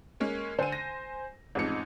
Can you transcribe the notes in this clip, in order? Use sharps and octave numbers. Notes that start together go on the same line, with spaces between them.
G#3 A#3 C#4
D3 C5 G#5 D#7
A#6
A1 F2 G#3 D#4 C#7